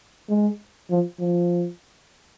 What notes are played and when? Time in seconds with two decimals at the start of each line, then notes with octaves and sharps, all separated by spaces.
0.29 G#3
0.90 F3
1.20 F3